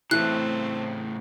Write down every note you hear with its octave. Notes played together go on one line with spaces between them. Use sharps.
A2 C#3 E3 A3 C4 F#6